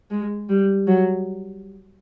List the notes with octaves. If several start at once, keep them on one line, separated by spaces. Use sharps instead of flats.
G#3
G3
F#3